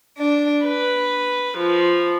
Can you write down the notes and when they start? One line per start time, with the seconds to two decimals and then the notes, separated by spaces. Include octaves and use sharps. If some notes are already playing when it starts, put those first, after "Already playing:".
0.17 D4
0.63 B4
1.56 F3